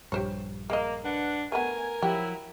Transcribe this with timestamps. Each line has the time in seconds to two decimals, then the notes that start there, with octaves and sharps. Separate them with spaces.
0.12 A#1 G2 G4 C5 C#5
0.70 G#3 A#3 D#5
1.04 D4 B4 F#5
1.52 A3 B3 A#4 G#5
2.02 F3 F#3 E4 G4